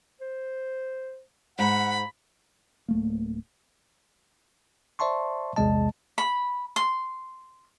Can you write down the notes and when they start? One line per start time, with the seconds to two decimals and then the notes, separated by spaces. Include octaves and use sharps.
0.21 C5
1.59 G#2 F#5 B5
2.88 D1 A3 A#3
4.99 C5 D5 E5 A5 C6 C#6
5.56 A#1 E2 C3 G#3 D#5 A5
6.18 B5
6.76 C6